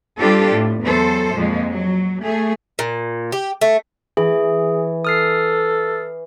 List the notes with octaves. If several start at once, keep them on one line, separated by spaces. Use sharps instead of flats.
G3 C4 D4 F4 G4 A4
A2
E2 F#3 A4 C5
F2 A#2 F3 G#3
F#3
A3 G#4
A#2
G4
A3
E3 G#4
A4 D#6 F6 C7